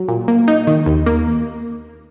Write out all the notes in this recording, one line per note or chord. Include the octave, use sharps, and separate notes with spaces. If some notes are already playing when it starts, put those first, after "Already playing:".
Already playing: F#3
A#2
A#3
D#4
D#3
D#2
A#3